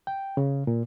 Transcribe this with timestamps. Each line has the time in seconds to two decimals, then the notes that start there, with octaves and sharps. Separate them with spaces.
0.07 G5
0.37 C#3
0.67 A#2